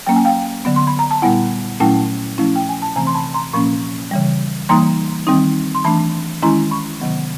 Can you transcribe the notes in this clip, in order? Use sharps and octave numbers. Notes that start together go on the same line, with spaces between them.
F#3 A#3 C#4 G5
G#5
F5 G5
D3 F#3 B3
C6
B5
A#5
A5
A#2 G3 B3 E4 F#5 G#5
A#2 F#3 A3 C#4 E4 G5 A5
F3 A3 C#4 E4
G5
G#5
A5
C3 E3 A3 C4 G#5 A#5
C6
A5 B5
A#5 C6
A#2 F3 A#3 C#4 B5 C#6
C#3 E3 G3
E3 G3 A#3 D#4 A#5 C6
D#3 G3 C4 D#4
C6
E3 A3 D4 A5 B5
D#3 G#3 C#4 E4 A#5 C6
B5 C#6
C3 D#3 F#3 B3